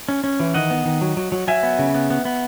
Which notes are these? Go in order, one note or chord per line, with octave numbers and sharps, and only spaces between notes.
C#4
C#4
E3
D#3 D#5 F#5
B3
D#3
F#3
F#3
F#3
F#3 E5 G#5
B3
C#3
B3
B3
B3